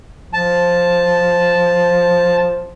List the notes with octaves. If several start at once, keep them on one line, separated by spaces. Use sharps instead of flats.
F3 A5